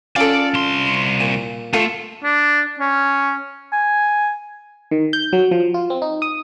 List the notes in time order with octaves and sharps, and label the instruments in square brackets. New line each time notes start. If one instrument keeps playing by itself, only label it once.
[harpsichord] C#4 [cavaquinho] F4 A4 [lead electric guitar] D5
[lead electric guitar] C2 C6
[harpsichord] A#2
[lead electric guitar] A3 [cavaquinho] F4 A4
[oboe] D4
C#4
G#5
[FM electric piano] D#3
G6
F#3
F3
F4
C4
D#4
D#6